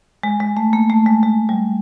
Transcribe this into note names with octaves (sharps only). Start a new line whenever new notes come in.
G#3
G#3
A3
A#3
A3
G#3
G#3
G3